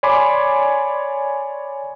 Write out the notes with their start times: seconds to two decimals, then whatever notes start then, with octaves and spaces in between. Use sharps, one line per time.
0.03 C#5 D5 G#5 B5 C6 D6